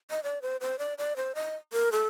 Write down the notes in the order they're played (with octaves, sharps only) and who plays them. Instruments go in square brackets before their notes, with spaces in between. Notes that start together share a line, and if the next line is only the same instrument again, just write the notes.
[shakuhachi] D#5
D5
C5
C5
D5
D5
C5
D#5
A#4
A4